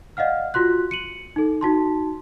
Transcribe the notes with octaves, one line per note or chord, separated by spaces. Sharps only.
D5 D#5 F5 F#5 F6
F4 F#4 C6 F#6
C#7 D#7 F#7
D#4 A4
D#4 F#4 A5 C6